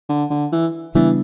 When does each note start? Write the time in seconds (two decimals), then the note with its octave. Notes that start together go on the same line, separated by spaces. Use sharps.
0.09 D3
0.31 D3
0.52 E3
0.95 C#3 E3 G3 B3 D4